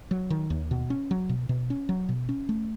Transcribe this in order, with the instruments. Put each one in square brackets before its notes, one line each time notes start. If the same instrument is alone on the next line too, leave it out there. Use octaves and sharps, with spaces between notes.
[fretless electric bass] F#3
D#3
D#2
B2
C#4
F#3
B2
B2
C#4
F#3
B2
C#4
A3